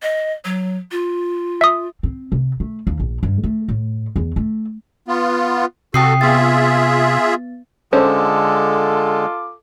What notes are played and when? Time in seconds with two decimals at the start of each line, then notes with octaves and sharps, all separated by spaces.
0.02 D#5
0.45 F#3
0.91 F4
1.61 E5 D#6
2.03 C4
2.32 C3
2.60 A3
2.87 D#2
3.00 A#1
3.23 G2
3.44 A3
3.69 A2
4.16 E2
4.36 A3
5.08 B3 F4
5.94 C3 F#4 A4 G5 D#6 C7
6.21 B3 F4 G#4 E5 A6
7.93 D3 G#3 C#4 F4 A4 C5 D6